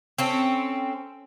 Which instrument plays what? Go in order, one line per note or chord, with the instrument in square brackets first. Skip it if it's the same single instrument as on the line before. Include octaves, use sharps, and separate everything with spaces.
[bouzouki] C4 C#4 A4